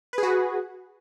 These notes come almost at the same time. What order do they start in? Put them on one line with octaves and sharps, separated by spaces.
B4 G#4 F#4